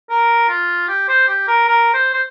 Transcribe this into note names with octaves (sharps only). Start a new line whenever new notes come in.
A#4
F4
G4
C5
G4
A#4
A#4
C5
C5